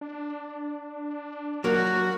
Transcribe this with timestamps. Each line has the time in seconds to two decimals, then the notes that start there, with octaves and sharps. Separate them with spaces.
0.01 D4
1.64 F#3 A#3 F#4